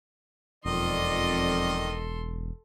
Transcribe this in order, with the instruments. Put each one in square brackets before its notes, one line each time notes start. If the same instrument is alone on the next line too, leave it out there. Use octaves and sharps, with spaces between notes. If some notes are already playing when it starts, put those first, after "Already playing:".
[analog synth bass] E1 [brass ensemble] F2 D5 [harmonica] D#3 D#5 [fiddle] A4 C6